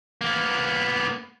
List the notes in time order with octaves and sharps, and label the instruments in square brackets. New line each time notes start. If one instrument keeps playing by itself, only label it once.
[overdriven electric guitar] A#3 B3